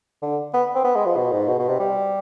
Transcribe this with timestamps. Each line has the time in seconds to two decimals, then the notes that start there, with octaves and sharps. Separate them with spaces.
0.22 D3
0.54 B3
0.75 C4
0.84 B3
0.95 G#3
1.06 F3
1.17 B2
1.32 G#2
1.48 B2
1.59 B2
1.68 C3
1.79 G3